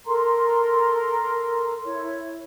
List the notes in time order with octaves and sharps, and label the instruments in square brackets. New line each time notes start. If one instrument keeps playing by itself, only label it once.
[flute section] A4 A#4 A#5 C6
E4 C#5